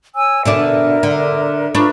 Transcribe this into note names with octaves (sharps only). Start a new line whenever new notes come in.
C#5 G#5 E6
B2 D3 D4 A#4 D5 E5
D3
D4 F4 B4 A#5 C#6